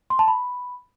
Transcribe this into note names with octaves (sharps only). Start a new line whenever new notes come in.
C6
A5
B5